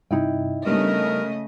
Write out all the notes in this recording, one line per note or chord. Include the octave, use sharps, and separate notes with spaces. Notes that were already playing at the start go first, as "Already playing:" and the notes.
G2 C3 D#4 E4 G5
C#3 G3 A3 B3 D4 A#4 D#5